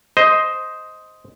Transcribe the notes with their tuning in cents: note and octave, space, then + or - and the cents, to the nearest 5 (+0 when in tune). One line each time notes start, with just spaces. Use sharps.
C5 -5 D#5 +10